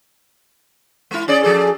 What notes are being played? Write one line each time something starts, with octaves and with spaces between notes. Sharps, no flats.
G#3 E4
C#4 G#4 D5
F3 G#4 A4